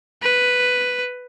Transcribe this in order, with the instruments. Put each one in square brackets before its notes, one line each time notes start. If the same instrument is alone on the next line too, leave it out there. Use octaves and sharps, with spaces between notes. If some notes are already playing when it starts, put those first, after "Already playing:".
[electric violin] B4